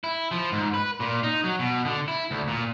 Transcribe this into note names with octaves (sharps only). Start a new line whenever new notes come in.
E4
F3
G#2
B4
A#2
D#4
F#3
B2
D3
E4
D2
A#2